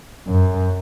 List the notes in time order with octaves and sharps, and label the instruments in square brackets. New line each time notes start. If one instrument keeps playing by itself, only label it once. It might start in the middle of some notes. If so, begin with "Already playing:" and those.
[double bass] F#2